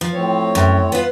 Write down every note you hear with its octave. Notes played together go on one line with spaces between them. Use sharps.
F3
A2 C4 C#5
F#2
B3 F4